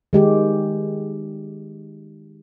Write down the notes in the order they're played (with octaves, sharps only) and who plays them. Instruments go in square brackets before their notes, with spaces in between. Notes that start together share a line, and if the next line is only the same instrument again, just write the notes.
[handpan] D#3 G#3 G4